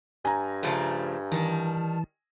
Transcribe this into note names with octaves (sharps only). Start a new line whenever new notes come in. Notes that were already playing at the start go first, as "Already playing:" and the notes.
G2 G#5 A#5
C#3 F3 A3
D#3 E3 G3 A5